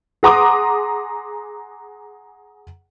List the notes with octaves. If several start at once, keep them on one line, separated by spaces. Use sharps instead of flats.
G#4 F#5 A#5 C6 D6 D#6